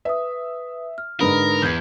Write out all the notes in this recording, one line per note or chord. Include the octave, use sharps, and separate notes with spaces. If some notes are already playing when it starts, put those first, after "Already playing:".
B4 E5 D#6
F6
G#2 D3 A#4 B4 B5 D#6
E2 G6 G#6